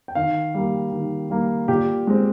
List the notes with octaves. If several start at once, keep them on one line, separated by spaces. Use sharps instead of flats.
G5
D#3 F5
G3 A#3
D#3
G3 A#3
A#2 G4
G#3 C4